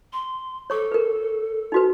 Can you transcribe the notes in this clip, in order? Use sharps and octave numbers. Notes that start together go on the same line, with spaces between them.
C6
A4 C#5 C#6 D6
A#4 B4
D#4 F#4 B4